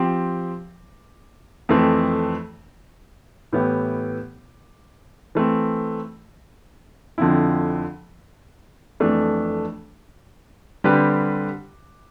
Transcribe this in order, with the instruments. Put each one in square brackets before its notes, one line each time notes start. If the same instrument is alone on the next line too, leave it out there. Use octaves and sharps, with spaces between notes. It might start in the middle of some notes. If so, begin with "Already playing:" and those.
Already playing: [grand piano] F3 C4 G4
F2 E3 A3 C4
A2 E3 B3 E4 G4
E3 A3 C4
F2 D3 F3 C4 E4
F2 E3 A3 D4
D3 G3 C4 G4 B4